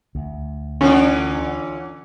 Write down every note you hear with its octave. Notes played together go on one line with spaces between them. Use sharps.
D2
D3 E3 C#4 F4